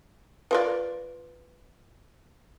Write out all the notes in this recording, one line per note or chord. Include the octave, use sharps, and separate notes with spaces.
F4 A#4 B4 D5